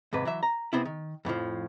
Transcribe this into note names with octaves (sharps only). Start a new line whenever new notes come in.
D#2 G#2 C3 B4
E3 F#3 E5
A#5
C3 B3 C4 E4
D#3
F2 A2 E3 F3